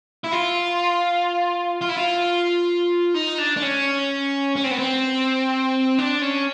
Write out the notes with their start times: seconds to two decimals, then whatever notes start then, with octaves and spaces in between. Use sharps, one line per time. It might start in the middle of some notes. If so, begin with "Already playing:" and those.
0.24 E4
0.32 F4
1.81 F4
1.89 E4
1.96 F4
3.14 D#4
3.38 D4
3.57 D4
3.62 C#4
4.56 C#4
4.64 C4
4.71 B3
4.79 C4
5.98 D4
6.22 C#4